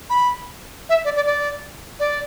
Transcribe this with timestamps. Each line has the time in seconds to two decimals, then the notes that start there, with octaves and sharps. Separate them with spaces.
0.10 B5
0.89 E5
1.05 D5
1.16 D5
1.26 D5
1.99 D5